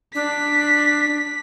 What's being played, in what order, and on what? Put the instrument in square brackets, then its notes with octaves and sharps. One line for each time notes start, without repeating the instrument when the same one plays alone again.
[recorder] D4 [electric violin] B6